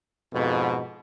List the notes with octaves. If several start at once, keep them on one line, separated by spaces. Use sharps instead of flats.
F2 G#2 B2